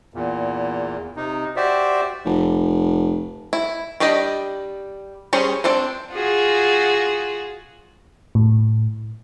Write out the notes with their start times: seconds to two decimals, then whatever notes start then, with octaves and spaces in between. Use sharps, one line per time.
0.14 E2 A#2
1.16 C3 D#4
1.56 F#4 G4 C5 D5 E5
2.25 F1
3.53 E4
4.00 G3 D4 G4 D5 D#5
5.33 G3 C#4 G#4 C5 C#5
5.64 C4 D4 A4 C5
6.13 F4 F#4 G#4
8.35 A2